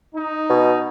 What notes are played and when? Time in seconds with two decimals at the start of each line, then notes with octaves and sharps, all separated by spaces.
0.14 D#4
0.49 B2